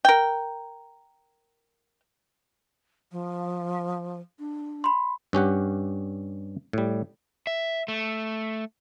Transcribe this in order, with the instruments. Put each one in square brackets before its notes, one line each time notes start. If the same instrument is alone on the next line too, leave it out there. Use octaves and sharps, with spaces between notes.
[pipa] A#4 G5
[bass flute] F3
D4
[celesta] B5 C6
[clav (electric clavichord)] G2 C#4 G4 F#5
A2 G3
[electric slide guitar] E5
A3